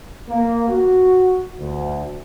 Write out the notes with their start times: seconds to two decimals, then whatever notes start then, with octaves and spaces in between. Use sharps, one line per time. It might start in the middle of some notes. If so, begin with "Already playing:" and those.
0.29 A#3
0.69 F#4
1.60 D2